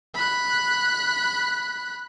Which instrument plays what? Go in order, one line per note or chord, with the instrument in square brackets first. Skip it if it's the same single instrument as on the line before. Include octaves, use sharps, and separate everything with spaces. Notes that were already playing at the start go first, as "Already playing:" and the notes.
[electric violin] B5 F#6